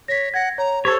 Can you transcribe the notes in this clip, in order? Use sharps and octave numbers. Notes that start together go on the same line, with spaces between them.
C#5 A#6 B6
F#5 G#6 A#6
C#5 A#5
G4 A4 C5 C#5 G#6